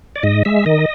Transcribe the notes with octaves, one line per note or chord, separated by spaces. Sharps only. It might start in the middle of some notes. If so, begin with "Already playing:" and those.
D5
G#2 D#5
G#3 E5
D#3 D#5